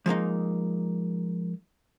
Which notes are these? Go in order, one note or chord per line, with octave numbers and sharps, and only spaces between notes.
F3 G#3 A#3 D#4